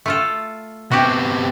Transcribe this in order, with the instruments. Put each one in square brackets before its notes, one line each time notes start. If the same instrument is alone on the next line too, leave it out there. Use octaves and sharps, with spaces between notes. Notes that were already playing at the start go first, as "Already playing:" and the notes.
[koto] A3 F4 A4
[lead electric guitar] C3 B3 [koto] F#4 G4